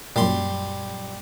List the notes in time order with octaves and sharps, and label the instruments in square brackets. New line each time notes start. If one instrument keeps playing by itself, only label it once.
[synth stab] F#2 A#2 [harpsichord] G3 C6